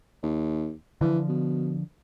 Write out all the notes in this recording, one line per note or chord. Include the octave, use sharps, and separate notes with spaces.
D#2
D3 E3 F3
B2